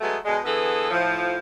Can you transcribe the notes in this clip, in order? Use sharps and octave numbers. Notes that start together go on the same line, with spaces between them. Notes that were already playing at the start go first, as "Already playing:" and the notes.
F#3 G#3 A3 B3
B2 D3 G#3
D3 E3 B3 G#4 A4
A2 F3